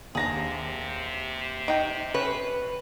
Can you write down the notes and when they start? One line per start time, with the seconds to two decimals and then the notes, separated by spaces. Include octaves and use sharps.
0.15 D#2 C3 D4 G#4 A5 A#5 A#6
1.68 D#4 G5 D7
2.14 C#4 B4